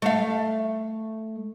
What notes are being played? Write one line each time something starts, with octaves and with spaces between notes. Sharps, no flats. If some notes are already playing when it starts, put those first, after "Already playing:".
A3 F5